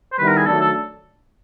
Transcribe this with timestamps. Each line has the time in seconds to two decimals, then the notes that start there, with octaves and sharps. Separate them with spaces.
0.13 C5
0.18 D#3 G3 B3 E4 B4
0.28 A#4
0.37 G#4
0.46 D#3 F#3 A3 D4 A4
0.61 A4